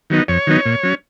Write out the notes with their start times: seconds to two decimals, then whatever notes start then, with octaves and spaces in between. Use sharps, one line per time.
0.10 D#3 F#3 B3 D#4
0.28 F2 C#5
0.47 D#3 F#3 B3 D#4
0.66 A#2
0.83 F#3 C#4